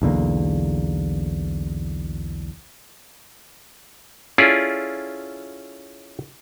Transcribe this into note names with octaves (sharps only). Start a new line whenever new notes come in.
B1 E2 D3 A#3
C#4 E4 F4 G#4 A4 D5